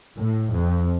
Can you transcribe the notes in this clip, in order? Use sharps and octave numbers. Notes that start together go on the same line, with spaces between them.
A2
F2